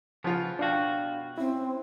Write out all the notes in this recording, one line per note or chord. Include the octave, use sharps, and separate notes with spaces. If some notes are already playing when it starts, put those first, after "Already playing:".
C#3 F3 B3 F4
B2 D4 F#4 F5 G5
C4 C#4 E4